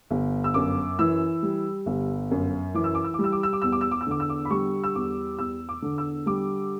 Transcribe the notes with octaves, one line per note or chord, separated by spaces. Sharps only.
G1
E6
F#2 D6
E3 E6
G3
G1
F#2
E3 D6
E6
D6
E6
D6
G3
E6
D6
E6
D6
E2 E6
D6
E6
D6
E6
D3 D6
E6
D6
B5
G3 C#6
E6
E2 D6
E2 E6
D6
D3
E6
G3 D6